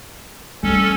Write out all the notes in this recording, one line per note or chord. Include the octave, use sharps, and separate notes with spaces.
G3 C#4 A4